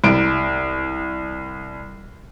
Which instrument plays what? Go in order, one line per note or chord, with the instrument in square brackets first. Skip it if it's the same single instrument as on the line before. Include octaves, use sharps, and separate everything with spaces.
[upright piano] C2 D7